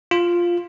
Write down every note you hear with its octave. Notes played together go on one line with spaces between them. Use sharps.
F4